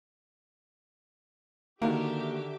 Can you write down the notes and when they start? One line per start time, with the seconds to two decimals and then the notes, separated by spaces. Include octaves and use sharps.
1.82 D3 D#3 A#3 F#4 G4 A#4 E5 D6